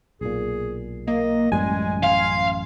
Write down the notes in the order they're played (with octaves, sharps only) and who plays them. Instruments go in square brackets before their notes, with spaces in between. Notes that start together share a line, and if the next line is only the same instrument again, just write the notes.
[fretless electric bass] B1 A#2 [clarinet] G#4
[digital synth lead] A#3 [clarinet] D#5
[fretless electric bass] A1 F#2 G3 [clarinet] G#3 [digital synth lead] G#5
[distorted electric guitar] F5 [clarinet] C6